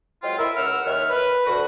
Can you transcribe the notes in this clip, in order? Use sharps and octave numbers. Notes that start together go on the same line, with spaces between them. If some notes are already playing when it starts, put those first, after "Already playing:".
F#3 G#3 C4 F4
E4 A#4 E5
C#2 C#3 A#4 F#5 E6 F6
D#2 D#3 C#5 E5 F6
B4
D2 F#4